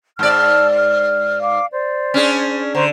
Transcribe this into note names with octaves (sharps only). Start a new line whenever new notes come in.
G#2 D5 A5 E6 F6
F6
F5 D6
C5 D5
C#4 D4 G#4
D3 C5 A#5 C#6